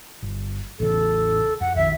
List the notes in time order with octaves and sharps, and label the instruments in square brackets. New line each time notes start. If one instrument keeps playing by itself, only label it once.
[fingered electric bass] G1
[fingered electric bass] A1 E2 C#3 [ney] A4
[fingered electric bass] F2 [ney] F#5
[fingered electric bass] A#1 D#3 [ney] E5